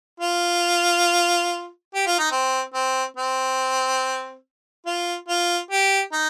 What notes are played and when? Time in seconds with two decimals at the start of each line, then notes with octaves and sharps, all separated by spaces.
0.20 F4
1.95 G4
2.07 F4
2.19 D#4
2.31 C4
2.74 C4
3.17 C4
4.86 F4
5.29 F4
5.71 G4
6.13 D#4